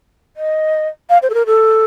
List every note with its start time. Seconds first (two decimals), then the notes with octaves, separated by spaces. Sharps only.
0.37 D#5
1.10 F5
1.22 C5
1.30 A4
1.34 A#4
1.46 A4